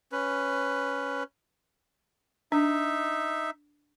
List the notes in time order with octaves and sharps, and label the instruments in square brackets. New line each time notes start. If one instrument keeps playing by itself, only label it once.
[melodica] C#4 B4
[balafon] D4 [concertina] D#4 E5